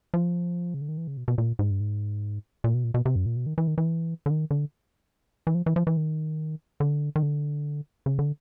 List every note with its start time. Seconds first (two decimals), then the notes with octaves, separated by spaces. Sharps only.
0.14 F3
0.74 C#3
0.81 D3
0.89 D#3
0.97 E3
1.07 C#3
1.17 B2
1.28 B2
1.38 A#2
1.59 G#2
1.71 G2
1.80 G#2
2.64 A#2
2.74 B2
2.84 A#2
2.94 B2
3.06 C3
3.16 F#2
3.26 A#2
3.36 B2
3.46 D#3
3.58 E3
3.67 D#3
3.78 E3
4.26 D3
4.30 D#3
4.51 D3
5.47 E3
5.55 F3
5.66 E3
5.76 F3
5.87 E3
5.97 D#3
6.80 D3
7.16 D#3
7.23 D3
8.06 C#3
8.19 D3